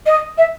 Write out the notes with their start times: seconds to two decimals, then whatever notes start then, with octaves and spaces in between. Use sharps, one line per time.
0.06 D#5
0.38 E5